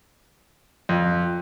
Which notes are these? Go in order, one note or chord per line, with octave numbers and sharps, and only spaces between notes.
F2